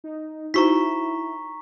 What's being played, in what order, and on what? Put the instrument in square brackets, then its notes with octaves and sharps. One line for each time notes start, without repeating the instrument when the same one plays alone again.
[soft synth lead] D#4
[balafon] D#4 F#4 C5 [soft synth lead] E4 [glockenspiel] A#5 C#6 B6